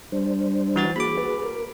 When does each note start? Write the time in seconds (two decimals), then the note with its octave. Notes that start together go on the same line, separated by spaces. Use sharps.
0.12 G3 D4 C5
0.76 E3 F#4 A6
0.96 A#3 F#4 G#4 B5 D6
1.18 G#4 B4
1.45 A#4